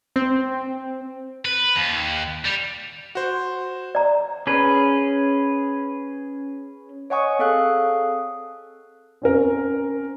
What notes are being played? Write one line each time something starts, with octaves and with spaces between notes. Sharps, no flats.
C4
B4
D#2
G3
F#4 C5
D5 A#5
C#4 G#4 B4
C#5 D#5 F#5 G#5 C#6 D#6
C4 G#4 A4 F5 D#6 F#6
C4 C#4 A#4